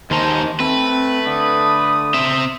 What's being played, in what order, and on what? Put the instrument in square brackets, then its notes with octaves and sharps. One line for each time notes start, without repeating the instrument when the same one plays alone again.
[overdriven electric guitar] D#2 D#4 [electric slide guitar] D#3 G#5 A5 [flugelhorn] C5
[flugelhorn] A3 [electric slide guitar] C4 [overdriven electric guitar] B4
[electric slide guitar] D3 [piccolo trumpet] D#6
[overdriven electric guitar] C4 E5